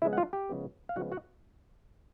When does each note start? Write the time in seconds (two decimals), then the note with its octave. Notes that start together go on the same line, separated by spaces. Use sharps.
0.02 C#3 F3 G#3 B3 E4 E5
0.13 F#5
0.17 F4 F5
0.33 G4 G5
0.49 C#3 F3 G#3 B3
0.89 F5
0.96 C#3 F3 G#3 B3 F#4 F#5
1.12 F#4 F#5